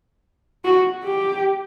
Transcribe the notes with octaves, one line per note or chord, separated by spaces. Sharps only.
F#4
G4